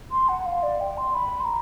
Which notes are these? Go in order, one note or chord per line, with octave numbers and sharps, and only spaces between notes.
C6
F#5
F5
D5
G5
C6
B5
C6
A#5